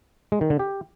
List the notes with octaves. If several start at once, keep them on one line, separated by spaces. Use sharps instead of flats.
G#3
D#3
D3
G4